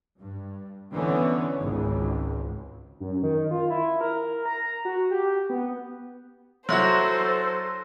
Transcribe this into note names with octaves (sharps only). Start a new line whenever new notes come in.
G2
D3 E3 B3 C#4
G#1 C#2
F#2
D#3
F4
E4
A#4
A#5
F#4
G4
B3
F#3 E4 F#4 A4 C5 C6 F#6 A#6